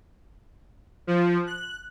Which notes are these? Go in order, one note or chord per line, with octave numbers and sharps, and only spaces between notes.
F3
F#6